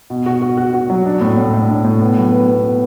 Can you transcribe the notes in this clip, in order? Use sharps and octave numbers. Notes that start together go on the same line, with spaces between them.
B2
F#4
F#4
F#4
F#4
F#3
D4
A2
A2
A2
D4
A2
B3
F#3
B4
B3
B3